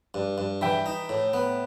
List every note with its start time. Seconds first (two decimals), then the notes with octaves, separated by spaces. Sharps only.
0.14 G2
0.38 G2
0.61 E3 E5 G5
0.86 D#4
1.09 A2
1.33 B3